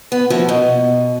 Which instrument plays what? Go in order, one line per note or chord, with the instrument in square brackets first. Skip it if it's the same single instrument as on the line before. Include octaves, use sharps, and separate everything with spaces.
[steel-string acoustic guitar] B3
F3 A#3 E4 F#4
B2